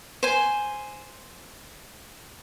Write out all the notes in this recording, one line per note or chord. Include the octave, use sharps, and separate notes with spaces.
C5 G#5